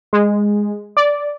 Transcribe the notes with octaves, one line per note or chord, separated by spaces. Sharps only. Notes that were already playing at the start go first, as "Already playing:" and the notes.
G#3
D5